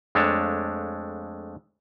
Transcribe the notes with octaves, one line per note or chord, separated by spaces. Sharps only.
F2 G#3 A3 D4 C#5 A5